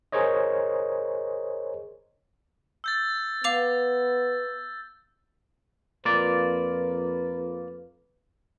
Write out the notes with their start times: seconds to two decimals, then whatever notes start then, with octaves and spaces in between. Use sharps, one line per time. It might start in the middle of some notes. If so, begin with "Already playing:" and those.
0.12 G#4 A#4 C5 C#5 D#5
2.84 E6 G6 A6
3.44 B3 F5 D6 F7
6.05 F2 A#3 F4 B4 D5